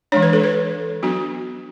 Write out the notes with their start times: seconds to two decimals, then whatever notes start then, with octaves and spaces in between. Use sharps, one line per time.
0.12 E3 G#3 D4 C#5
0.23 B4
0.33 A4
0.43 B4
1.03 F#3 B3 D4 F#4